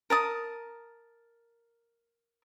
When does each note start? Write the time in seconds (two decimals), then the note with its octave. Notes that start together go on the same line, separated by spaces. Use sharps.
0.10 A#4 A5 D#6